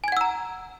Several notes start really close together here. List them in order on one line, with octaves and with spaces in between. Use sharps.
G#5 G#6 F#5 E6 A#5